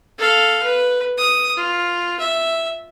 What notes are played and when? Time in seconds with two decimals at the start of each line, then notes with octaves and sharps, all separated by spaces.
0.18 A4 F5
0.63 B4
1.17 D#6
1.57 F4
2.20 E5